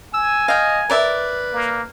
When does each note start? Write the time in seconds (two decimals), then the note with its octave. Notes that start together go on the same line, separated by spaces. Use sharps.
0.14 G#5 E6
0.48 D#5 F5 G5
0.90 A#4 B4 D5 E5
1.53 A#3